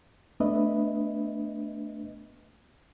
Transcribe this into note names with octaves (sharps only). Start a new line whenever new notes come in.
A3 B3 D4 B4 D#5 E5